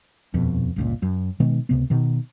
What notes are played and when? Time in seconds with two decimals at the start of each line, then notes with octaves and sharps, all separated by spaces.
0.34 D#1 F2 B2
0.76 G1 C#2 A#2
1.02 F#2
1.40 B2 D#3 G#3 B3
1.69 C#2 C3 B3
1.90 B2 D#3